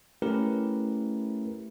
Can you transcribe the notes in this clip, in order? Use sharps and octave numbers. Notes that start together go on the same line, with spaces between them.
A3 C#4 E4 G4 A#4 B4